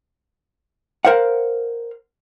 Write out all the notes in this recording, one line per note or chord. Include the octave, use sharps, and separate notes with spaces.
A#4 C5 F5 F#5